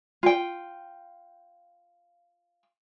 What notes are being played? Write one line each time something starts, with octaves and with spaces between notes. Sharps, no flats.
F4 G5